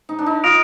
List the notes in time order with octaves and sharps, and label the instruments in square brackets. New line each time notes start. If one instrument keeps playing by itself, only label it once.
[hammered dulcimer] D#4
D4
D#4
[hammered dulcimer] F4 [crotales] D#6 A#6 D7 F7